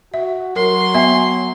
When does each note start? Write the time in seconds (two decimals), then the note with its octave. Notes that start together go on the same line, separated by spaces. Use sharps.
0.14 F#4 E5
0.56 F#3 A#4 C6
0.94 B3 E5 G#5